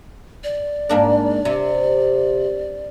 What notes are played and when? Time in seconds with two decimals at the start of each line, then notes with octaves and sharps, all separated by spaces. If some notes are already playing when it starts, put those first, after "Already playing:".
0.44 D5
0.89 G#2 A#3 D4
1.45 C3